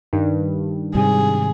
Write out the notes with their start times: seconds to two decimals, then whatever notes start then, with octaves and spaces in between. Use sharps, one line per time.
0.13 G2 D#3
0.95 G#2 C3 G3 G#4